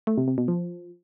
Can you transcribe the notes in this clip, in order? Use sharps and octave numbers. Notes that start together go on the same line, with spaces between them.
A3
C3
C3
B2
F3